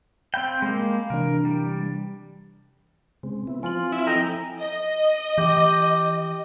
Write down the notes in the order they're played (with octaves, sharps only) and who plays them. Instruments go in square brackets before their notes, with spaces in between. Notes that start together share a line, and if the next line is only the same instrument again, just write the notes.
[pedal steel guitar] C4 G5 [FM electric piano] F5 B5
[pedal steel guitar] G#3 A#3
[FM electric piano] C3 E3 D4 [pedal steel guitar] A#4
[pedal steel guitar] G3
[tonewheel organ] C#3 G#3 C4
B3 E4
[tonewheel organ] F3 C4 [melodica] F4 [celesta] G#5 C6 F#7
[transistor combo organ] E4
[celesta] A4 G#5 [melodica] D#5 G5 A#5
[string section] D#5
[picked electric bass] E3 [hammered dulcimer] G4